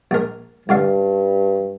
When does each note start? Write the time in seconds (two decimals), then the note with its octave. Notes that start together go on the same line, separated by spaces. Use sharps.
0.11 A#1 A#4
0.69 C2 G2 D3 F5